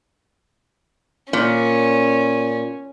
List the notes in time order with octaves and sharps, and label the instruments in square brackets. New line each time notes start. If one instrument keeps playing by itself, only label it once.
[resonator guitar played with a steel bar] A#2 [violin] C#4